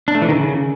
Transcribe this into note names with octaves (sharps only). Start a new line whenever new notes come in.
D4
A3
E3
D#3
C#3